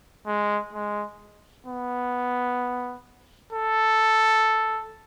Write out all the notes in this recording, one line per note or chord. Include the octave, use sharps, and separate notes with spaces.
G#3
G#3
B3
A4